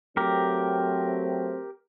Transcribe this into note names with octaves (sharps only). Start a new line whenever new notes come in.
F#3 A3 C4 G4 A#4